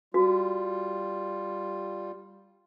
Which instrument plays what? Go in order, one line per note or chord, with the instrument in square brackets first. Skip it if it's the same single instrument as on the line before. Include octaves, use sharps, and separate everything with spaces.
[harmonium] G3 F4 [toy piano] F#4